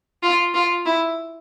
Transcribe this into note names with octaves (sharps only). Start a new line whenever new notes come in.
F4
F4
E4